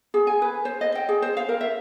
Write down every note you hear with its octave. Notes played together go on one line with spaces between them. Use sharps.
G#4
G#5
B4
C5
D#5
G5
G#4
C5
F5
A#4
E5